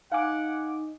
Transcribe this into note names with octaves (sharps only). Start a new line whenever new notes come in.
D#4 F5 F#5 G#5 D6